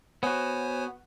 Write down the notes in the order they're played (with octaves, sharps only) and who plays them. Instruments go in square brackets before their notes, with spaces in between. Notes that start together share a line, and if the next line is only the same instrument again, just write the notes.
[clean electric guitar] B3 F#4 [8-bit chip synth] C5 C#5 G#5